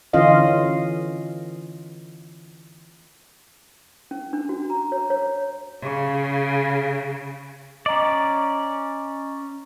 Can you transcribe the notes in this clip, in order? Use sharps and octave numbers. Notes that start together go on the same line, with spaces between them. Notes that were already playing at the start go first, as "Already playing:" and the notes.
D3 E3 C#4 F4 D#5 F5
C#4
D4
F#4
A#5
C#5
C#5
C#3
C#4 D5 D#5 A#5